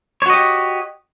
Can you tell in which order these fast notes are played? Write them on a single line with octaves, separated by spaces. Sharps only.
C#5 F#4 D#5 G4